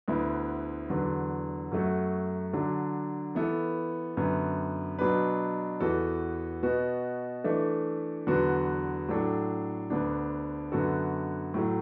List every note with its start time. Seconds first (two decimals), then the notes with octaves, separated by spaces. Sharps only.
0.08 D2 D3 B3 E4
0.89 E2 D3 F#3
1.71 F#2 F#3 A3 F#4
2.53 D3 F#3 D4
3.35 E3 B3 E4 A4
4.17 F#2 D3 B3
4.99 B2 F#3 D4 B4
5.80 E2 E3 B3 F#4 A4
6.63 B2 B3 F#4 B4
7.44 E3 A3 D4 A4 E5
8.27 E2 D3 F#3 B3 F#4
9.08 A2 F#3 D4 A4
9.90 D2 D3 B3 D4
10.72 F#2 D3 B3 F#4 A4
11.54 A2 F#3 A3